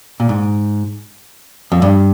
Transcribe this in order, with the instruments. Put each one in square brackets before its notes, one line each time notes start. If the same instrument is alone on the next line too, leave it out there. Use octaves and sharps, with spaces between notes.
[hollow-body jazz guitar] A#2
G#2
F2
G2